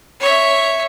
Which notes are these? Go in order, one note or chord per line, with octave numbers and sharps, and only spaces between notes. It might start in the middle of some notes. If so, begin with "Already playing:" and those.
C#5 E5